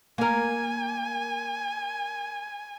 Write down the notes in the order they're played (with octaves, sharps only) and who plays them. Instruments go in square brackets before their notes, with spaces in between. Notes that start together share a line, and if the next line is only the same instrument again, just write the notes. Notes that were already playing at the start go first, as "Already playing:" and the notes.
[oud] A#3 A#4 [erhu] G#5